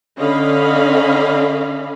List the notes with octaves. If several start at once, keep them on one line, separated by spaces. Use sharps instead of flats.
D3 C#4 D#5 F5 B5